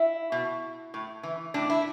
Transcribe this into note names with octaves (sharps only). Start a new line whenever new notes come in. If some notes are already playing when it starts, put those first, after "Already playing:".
Already playing: E4
B2
A2
E3
A2 D4
E4